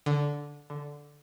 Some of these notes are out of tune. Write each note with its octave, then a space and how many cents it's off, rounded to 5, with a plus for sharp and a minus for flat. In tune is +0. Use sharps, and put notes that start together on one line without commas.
D3 -10
D3 -5